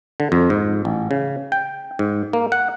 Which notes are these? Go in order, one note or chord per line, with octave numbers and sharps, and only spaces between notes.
D3
F2
G#2
A1
C#3
G5
G#2
A#3
F#5